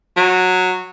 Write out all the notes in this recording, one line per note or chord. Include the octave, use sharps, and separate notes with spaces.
F#3